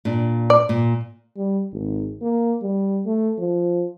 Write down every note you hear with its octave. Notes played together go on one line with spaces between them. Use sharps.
A#2 D4
D5
A#2
G3
G#1
A#3
G3
A3
F3